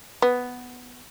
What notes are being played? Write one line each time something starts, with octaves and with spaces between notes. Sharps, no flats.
B3